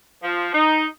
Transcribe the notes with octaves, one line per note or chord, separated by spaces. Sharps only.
F3
D#4